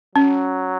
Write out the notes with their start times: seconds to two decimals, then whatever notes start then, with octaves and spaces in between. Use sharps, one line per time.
0.15 F#3 C#4